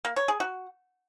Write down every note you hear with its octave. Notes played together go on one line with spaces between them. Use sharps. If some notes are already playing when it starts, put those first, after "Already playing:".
A#3
C#5
G#4
F#4